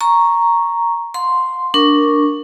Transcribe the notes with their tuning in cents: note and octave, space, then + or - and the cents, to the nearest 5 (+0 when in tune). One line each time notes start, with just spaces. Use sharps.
A#5 +0 C#6 +0
F5 +45 C6 +0
D4 +0 A#4 +0 C#6 +0